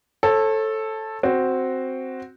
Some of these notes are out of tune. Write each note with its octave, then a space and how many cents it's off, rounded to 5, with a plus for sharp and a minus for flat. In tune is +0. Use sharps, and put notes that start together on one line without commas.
A4 +0 C#5 -40
C4 +0 F#4 +0